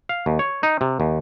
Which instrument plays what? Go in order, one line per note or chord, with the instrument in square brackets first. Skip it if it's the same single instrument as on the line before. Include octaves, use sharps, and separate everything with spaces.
[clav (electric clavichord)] F5
D#2
C#5
D#4
C3
D#2